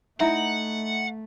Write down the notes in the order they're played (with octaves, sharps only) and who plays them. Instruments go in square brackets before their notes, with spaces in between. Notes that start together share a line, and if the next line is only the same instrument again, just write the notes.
[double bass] A3 [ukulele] D#4 E4 [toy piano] E5 A#5 [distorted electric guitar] F#5